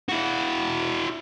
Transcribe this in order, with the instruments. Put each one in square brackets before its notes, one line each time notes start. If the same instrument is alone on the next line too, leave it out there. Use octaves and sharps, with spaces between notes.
[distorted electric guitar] E4 F#4